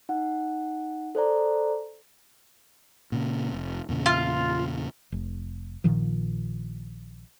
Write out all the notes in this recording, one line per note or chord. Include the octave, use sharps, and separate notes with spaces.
D#4 F#5
A4 C5 D5 A#5
A#2 C#3
F1
E2 A#2 C#3
F4
F1
A#1 A#2 D#3 F3